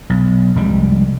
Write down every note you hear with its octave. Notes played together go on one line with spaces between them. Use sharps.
B1
F1 C2 G3 G#3